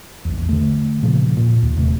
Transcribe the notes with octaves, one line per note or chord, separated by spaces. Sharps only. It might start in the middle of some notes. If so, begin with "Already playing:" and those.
A#1 E2
D3 A3
A#2 C#3 F3
A#2
D#2
D#1 C3 A3